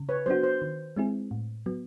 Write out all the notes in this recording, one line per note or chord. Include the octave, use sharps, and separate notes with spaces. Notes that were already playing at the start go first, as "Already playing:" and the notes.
Already playing: C#3
B4 C#5
F#3 B3 D4 F#4 C5
C5
D#3
G#3 C4 E4 G#4
A2
F#3 B3